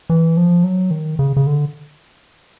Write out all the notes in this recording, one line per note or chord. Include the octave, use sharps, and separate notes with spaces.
E3
F3
F#3
D#3
C#3
C#3
D3